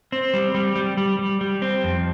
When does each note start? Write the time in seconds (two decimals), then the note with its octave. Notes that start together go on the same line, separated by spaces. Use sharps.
0.12 C4
0.34 G3
0.54 G3
0.76 G3
0.97 G3
1.19 G3
1.41 G3
1.62 C4
1.84 F2